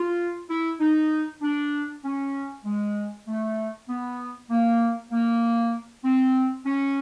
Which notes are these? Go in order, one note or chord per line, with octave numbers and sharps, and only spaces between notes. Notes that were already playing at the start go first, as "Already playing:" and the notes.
Already playing: F4
E4
D#4
D4
C#4
G#3
A3
B3
A#3
A#3
C4
C#4